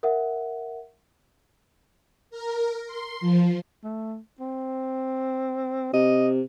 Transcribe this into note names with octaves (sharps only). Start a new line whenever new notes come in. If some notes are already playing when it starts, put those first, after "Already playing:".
A#4 E5 F#5
A#4
C6
F3
A3
C4
C3 D#5